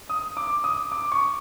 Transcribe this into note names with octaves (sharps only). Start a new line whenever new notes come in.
D#6
D6
D#6
D6
C#6